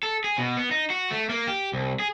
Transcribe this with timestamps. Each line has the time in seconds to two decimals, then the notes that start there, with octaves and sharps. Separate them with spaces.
0.03 A4
0.24 G#4
0.38 B2
0.57 B3
0.71 D#4
0.90 F#4
1.11 A3
1.29 A#3
1.47 G4
1.73 C2
2.00 G#4